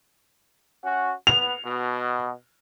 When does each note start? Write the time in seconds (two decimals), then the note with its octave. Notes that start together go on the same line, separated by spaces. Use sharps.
0.83 C#4 F#4
1.27 B3 F7
1.64 B2